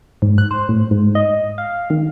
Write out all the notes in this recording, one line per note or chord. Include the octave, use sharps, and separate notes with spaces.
G#2
F#6
C5
A2
G#2
D#5
F5
D#3